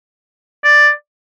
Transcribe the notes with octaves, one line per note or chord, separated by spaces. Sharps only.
D5